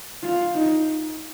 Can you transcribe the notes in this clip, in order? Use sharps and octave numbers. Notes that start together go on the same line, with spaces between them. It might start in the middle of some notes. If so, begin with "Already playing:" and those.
F4
D#4